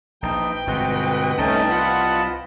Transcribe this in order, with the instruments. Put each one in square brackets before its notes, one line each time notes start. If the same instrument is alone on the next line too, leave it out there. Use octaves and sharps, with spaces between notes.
[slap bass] A#1 [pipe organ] D#4 [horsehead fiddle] B4 G5
[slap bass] G1 B2 [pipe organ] G#3 C4 F#4
[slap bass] C2 [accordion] A3 C#4 D#4 [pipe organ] D#5 A5
[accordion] F4 F#5 B5